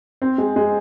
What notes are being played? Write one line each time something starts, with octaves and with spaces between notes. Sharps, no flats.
C4
G#3
G#3